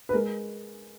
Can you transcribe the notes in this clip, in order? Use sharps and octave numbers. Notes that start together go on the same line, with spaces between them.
B4
G#3 A#4